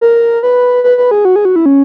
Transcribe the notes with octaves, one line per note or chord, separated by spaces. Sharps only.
A#4
B4
B4
B4
G#4
F#4
G#4
F#4
E4
C#4